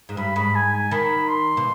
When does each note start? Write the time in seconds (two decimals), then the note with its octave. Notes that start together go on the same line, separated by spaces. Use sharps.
0.09 G#2
0.17 G2 B5
0.36 G#2 B5
0.55 G#5
0.73 G#5
0.91 D#3 B5
1.28 C6
1.57 B2